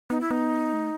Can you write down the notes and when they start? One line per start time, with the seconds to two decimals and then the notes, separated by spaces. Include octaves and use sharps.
0.10 B3 D#4
0.21 E4
0.31 B3 D#4
0.73 A3